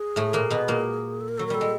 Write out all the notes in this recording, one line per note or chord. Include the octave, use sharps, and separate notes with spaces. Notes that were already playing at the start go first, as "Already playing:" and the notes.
Already playing: G#4
A2 A3
A#2 A#3
B2 B3
A#2 A#3
A4
A#4
F#3 A4
A#4
G3 A4
G#3